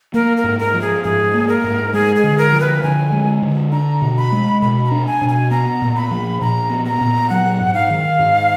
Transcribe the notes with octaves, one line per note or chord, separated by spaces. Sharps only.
A#3 A#4
A#4
G#2
A#4
F3
G#4
G#2 G#4
A#3
A#4
G#2
G#3 G#4
G#4
D3
A#4
F3
B4
D3 G#5
G#3
D3
D4 A#5
B2
B5
G#3
B2 B5
B5
D4 A#5
G#5
B2
G#5
B3 A#5
A#2
B5
F3
A#2 A#5
B3
A#5
A#2
F#3 F#5
G#2
F5
D#3
G#2